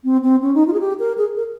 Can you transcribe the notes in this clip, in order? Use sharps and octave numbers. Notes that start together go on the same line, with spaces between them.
C4
C4
C#4
D#4
F4
G#4
G4
A#4
G#4
A#4